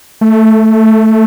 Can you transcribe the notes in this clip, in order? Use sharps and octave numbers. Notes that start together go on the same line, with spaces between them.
A3